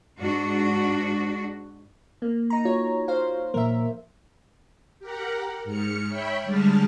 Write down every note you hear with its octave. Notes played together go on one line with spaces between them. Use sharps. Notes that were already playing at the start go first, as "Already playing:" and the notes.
G#2 D4 F#4
A#3
D#4 A#5
F4 F#4 C#5
C5 F5
A#2 F3 A#3 A#4 E5
G4 A#4 F#5
G#2 F6 C#7
C#5 E5 G5 B5
D3 G3 G#3 A5 F6